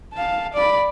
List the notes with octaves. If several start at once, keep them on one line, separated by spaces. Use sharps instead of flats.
F5 A5
D5 B5